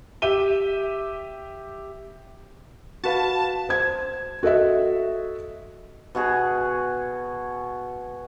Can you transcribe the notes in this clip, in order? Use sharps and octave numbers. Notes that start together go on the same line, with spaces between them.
G4 E5 D#7 G7
F#4 B4 F5 A5
C5 G#6
F#4 A4 D#5 E5
B2 F#4 G#4